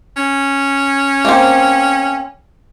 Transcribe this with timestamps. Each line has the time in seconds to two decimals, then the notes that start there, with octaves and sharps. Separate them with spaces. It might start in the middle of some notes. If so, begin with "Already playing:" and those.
0.17 C#4
1.25 A#3 C4